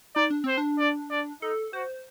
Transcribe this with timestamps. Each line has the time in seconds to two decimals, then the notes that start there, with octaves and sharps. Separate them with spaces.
0.16 D#4 D5
0.30 D4
0.44 C4 C5
0.58 D4
0.79 D5
1.11 D5
1.42 D#4 A4
1.73 F#4 C5